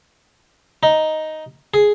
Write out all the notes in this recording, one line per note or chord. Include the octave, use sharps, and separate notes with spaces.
D#4
G#4